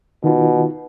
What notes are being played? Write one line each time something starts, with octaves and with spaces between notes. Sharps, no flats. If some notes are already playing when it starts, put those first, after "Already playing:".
B2 D#3 D#4 F4